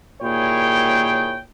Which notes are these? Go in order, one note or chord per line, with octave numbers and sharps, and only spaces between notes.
D#2 A#2 E4 G#4 C#5 G5